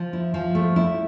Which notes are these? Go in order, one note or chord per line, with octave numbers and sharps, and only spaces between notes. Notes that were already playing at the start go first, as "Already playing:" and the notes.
Already playing: F3
E4
F3
A3
E4